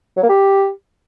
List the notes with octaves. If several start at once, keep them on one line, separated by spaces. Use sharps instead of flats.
F#3
A#3
G4